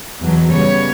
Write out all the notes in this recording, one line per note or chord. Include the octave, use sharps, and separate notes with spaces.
E2 B2 F#3
C#3 G3 B3 C#5